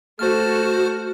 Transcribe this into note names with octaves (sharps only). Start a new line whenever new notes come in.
A3 F#4 C5 A5 F6